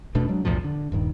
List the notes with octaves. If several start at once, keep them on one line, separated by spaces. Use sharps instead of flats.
E1 B2 A3 D4
F#3 G#3 D4
B1 E2 A2 F3
D3
D#1 G2 D#3